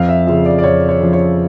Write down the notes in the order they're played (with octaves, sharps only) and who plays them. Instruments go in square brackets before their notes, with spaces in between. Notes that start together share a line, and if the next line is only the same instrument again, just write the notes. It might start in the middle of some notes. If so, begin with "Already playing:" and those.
Already playing: [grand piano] F2 F5
E5
C#3 F3 E5
D5
D5
F2 C#5
C#5
C#3 F3
C#5